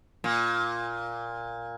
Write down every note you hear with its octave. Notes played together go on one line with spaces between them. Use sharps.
A#2